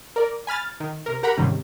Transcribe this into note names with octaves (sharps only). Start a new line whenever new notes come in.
A#4 D5
G#5 B5 F6 A6
D#3
C3 A#4
G4 A#4 F#5 A#5 B5
G#2 C3 D#3 G3 C#4